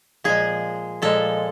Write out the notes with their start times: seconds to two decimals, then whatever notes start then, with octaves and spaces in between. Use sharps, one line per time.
0.24 A#2 F3 G#3 G#4
1.02 A#2 F3 G#3 A4